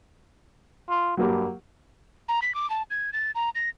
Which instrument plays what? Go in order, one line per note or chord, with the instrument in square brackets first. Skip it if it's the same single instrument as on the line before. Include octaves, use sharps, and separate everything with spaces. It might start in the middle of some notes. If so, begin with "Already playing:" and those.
[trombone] F4
[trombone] G2 [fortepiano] F#3 A#3 G4
[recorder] A#5
B6
D6
A5
G#6
A6
A#5
A#6